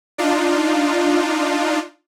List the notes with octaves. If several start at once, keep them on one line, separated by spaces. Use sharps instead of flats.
D4 D#4 F4